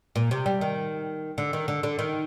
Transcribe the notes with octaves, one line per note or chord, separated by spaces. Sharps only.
A#2
C3
G3
D#3
D3
D#3
D3
D3
D#3